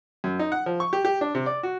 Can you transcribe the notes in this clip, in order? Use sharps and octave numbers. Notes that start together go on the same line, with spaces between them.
F#2
D#4
F#5
F3
C#6
G4
G4
D4
C3
D5
F#4